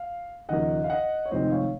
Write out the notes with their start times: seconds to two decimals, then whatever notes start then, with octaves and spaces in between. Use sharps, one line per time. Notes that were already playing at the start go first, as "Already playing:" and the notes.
Already playing: F5
0.49 D#2 C#3 F3 A#3 D#5 F#5
0.84 F5
0.90 D#5 F#5
1.26 C#5
1.31 F1 F2 D#3 G#3 C4 C5 D#5
1.52 C#5 F5